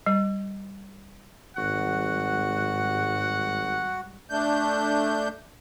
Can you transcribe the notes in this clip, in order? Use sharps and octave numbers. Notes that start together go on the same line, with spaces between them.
G3
G#1 G#2 G3 F#4 F#5
A3 D4 G6